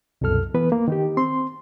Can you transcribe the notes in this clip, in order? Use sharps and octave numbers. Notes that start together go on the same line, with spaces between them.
C2 F#2 B2 A4 F6
E3 B3 B4
A#3
D#3 D#4 G4
C4 C6